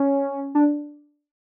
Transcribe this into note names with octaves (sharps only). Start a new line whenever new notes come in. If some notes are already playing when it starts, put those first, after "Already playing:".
Already playing: C#4
D4